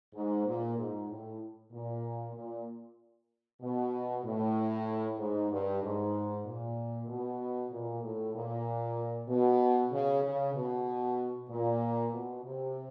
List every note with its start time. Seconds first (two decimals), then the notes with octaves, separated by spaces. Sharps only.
0.14 G#2
0.46 A#2
0.77 G#2
1.09 A2
1.72 A#2
2.34 A#2
3.61 B2
4.24 A2
5.18 G#2
5.50 G2
5.82 G#2
6.45 A#2
7.08 B2
7.70 A#2
8.02 A2
8.34 A#2
9.28 B2
9.92 C#3
10.23 C#3
10.54 B2
11.49 A#2
12.12 B2
12.44 C3